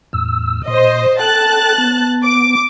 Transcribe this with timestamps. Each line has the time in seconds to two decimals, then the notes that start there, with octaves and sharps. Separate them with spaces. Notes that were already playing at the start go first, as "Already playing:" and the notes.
0.13 E2 A2 E6
0.67 A#2 C5 D#5 C6
1.19 A4 G5 A5 F#6 A6
1.78 B3
2.24 D6